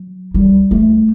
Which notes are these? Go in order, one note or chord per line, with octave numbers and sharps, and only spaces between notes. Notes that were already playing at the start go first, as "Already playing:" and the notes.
Already playing: F#3
G3
A3